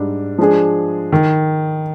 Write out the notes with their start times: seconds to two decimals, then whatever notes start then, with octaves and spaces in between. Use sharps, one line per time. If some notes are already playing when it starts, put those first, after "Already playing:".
Already playing: G#2 G3 D4
0.38 F3 G#3 D4 G#4
1.13 D#3